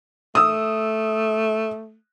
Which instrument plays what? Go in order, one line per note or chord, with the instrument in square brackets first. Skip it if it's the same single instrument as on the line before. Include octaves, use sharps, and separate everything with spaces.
[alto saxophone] A3 [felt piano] D#6 E6